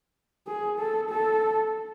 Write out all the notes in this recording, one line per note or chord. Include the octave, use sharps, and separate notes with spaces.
G#4
A4
A4